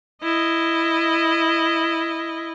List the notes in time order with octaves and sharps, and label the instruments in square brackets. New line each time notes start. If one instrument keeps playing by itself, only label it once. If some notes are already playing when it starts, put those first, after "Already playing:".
[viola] E4 D#5